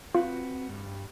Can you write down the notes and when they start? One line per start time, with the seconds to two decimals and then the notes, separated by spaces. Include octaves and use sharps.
0.14 C4 F4 F#4 B4
0.69 G2 G3